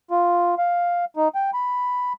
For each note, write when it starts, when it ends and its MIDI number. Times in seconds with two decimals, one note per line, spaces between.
0.11 0.55 65
0.58 1.05 77
1.16 1.28 63
1.35 1.51 79
1.54 2.13 83